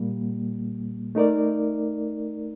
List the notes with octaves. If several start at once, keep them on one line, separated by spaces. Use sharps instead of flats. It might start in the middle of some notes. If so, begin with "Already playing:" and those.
Already playing: A#2 G3 A#3
A3 D#4 A#4 D5